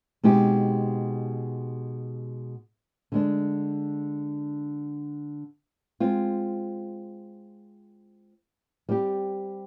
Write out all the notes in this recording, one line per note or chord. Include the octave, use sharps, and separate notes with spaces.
B2 G#3 C4 D#4 G4
D3 G#3 D4
G#3 C4 F4
G3 C4 G4